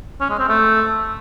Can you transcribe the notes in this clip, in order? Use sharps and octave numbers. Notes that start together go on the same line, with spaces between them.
C#4
G#3
C4
A3